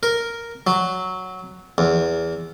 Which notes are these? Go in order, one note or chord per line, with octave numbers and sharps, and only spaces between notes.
A#4
F#3
E2